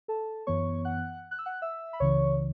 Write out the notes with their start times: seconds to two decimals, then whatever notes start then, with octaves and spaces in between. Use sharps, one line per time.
0.08 A4 A5
0.47 F#2 E3 B3 C#5 C#6
0.85 F#5 F#6
1.31 F#6
1.38 E6
1.45 F#5 F#6
1.62 E5 E6
1.93 B5
2.00 C#2 C#3 E3 C#5 C#6